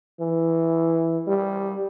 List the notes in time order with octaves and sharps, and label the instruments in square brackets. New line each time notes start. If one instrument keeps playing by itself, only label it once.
[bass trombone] E3
G3